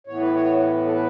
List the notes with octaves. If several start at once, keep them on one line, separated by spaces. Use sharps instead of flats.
A2 E3 B3 C#5
B4
C#5
A4
B4